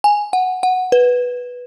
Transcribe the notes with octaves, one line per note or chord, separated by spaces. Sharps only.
G#5
F#5
F#5
B4